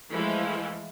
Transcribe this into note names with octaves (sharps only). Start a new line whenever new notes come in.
E3 F3 G#3 A3 E4